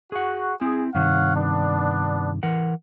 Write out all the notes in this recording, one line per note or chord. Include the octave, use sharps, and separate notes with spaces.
F#4 G#4 F#5
C4 E4 G#4
G2 C3 D#3 C#5 F5 F#5
B3 D4
E3 A#4 F#5